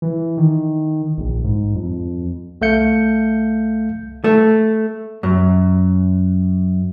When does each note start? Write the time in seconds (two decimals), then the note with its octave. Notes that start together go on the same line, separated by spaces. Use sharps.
0.02 E3
0.38 D#3
1.18 A#1
1.44 G#2
1.75 F2
2.61 C2 A3 F5 G6 C#7
4.24 A3
5.23 F#2